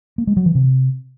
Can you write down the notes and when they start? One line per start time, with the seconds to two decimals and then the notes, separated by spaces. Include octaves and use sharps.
0.18 A#3
0.27 G#3
0.37 F#3
0.46 E3
0.55 C3